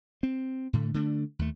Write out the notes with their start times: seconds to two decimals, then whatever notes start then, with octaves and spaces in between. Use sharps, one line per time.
0.23 C4
0.73 A2 D3 A3
0.94 D3 A3 B3 D4
1.39 D#2 A3